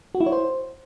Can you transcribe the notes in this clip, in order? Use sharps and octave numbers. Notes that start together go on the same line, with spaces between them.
F#4
E4
C#5
C5